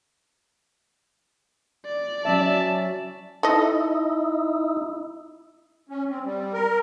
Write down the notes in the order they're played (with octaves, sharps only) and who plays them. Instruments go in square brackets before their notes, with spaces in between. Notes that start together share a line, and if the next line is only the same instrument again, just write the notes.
[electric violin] D5
[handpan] F#3 C#4 E5 [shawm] A5
[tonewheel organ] D#4 E4 [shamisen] A4 D#5
[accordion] C#4
C4
G3
A#4